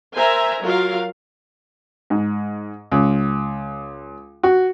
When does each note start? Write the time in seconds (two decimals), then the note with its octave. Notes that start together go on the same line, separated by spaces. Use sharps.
0.13 A#4 C5 E5 G#5 A#5
0.61 F#3 F4 A#4 F5
2.10 G#2
2.92 C#2
4.43 F#4